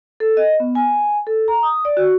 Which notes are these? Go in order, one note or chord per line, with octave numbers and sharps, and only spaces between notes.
A4
D#5
B3
G#5
A4
A#5
D#6
D5
F#4